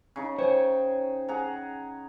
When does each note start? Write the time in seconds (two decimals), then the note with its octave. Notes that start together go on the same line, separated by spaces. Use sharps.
0.16 C#3 D#4
0.38 C5 C#5 G5 G#5
1.28 G#4 F#5 A#5